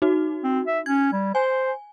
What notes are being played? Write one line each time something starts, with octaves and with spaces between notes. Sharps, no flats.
D#4 F#4
C4
E5
C#4 G#6
G3
C5 G#5